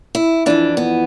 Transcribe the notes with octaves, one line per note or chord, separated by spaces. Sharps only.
E4
F2 E3 D4
B3